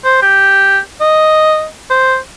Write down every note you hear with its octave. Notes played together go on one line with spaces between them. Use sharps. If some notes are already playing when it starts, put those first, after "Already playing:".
C5
G4
D#5
C5